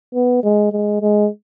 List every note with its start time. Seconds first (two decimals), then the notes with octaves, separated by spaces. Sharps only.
0.14 B3
0.43 G#3
0.72 G#3
1.01 G#3